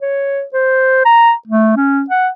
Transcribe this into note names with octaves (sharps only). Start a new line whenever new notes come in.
C#5
C5
A#5
A3
C#4
F#5